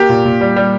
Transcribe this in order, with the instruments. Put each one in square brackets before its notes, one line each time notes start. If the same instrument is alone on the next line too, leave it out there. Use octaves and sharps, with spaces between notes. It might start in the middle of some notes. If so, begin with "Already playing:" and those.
Already playing: [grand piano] A#3 G4
A#2
A#2
G3
G3